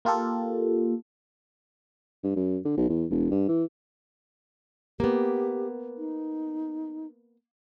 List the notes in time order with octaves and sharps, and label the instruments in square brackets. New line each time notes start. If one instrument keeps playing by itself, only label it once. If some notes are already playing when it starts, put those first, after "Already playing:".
[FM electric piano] A#3 F4 G4 A4
[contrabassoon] G2
F#2
D3
B1
E2
E1
G2
E3
[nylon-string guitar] A#3 B3 [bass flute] G4
[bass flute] D#4